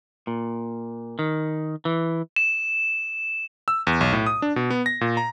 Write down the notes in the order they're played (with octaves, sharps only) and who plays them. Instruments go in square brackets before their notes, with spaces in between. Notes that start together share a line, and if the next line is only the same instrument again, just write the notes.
[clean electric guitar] A#2
D#3
E3
[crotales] E7
[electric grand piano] E6
E2
B1
A2
D#6
D4
B2
B3
A#6
A#2
A#5